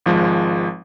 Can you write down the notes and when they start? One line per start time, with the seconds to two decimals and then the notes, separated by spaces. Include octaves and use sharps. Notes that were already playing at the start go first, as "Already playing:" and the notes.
0.06 G#1 F3 G#3